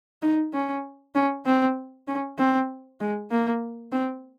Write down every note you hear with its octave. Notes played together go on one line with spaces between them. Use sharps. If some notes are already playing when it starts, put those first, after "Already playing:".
D#4
C#4
C#4
C4
C#4
C4
G#3
A#3
C4